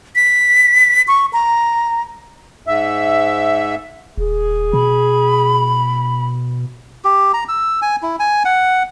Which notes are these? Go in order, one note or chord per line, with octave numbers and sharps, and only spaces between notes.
B6
C#6
A#5
G#2 E5
D#1 G#4
B2 B5
G4
A#5
E6
G#5
E4
G#5
F#5